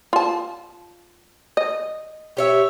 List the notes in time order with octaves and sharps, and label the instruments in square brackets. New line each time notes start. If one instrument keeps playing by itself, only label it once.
[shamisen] F4 A5
D#5
[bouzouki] G4 C#5 E5